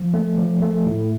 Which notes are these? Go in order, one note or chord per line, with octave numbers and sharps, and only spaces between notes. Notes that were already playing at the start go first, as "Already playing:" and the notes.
Already playing: F3
A3
F3
A3
A2